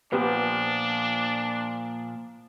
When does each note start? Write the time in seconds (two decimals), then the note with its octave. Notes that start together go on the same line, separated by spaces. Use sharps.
0.12 A#2 F3 B3 D4 G4 B4